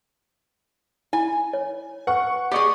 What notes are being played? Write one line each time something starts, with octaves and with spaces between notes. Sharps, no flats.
E4 G#5
C#5
B4 F#5 C#6
G4 G#4 D5 D#5 C#6